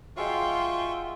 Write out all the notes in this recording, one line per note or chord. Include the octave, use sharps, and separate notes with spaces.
F#3 G#3 F4 E5 F5 G5 C6 C#6